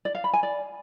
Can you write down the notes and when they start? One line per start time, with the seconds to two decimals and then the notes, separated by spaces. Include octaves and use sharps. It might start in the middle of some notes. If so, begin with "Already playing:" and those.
0.05 D5
0.15 F5
0.24 B5
0.33 G#5
0.43 D5